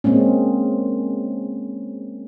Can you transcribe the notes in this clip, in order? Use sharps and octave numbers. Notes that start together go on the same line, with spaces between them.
G#3 A#3 C4 C#4